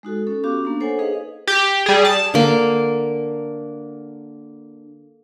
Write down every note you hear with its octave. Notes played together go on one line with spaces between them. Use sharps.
G#3 D#4 F#4 A4
C#4 A4
B3 C#4 F#4 G4 F5 D6
A#3 D4
A4 C5 C#5 F#5 G#5
D#4 G#4 B4 D#5 F5
G4
G3 G#4
A5
D3 A#3